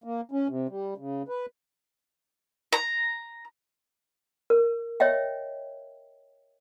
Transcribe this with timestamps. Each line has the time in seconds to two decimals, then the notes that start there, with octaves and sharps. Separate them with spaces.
0.04 A#3
0.31 C#4
0.48 C3
0.69 G3
0.97 C#3
1.28 B4
2.73 A#5
4.50 A#4
5.00 C#5 D#5 E5 G5